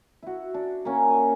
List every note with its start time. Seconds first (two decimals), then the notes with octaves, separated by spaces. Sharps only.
0.23 E4 F#4
0.54 D4
0.85 A#3 C#4
1.10 G#5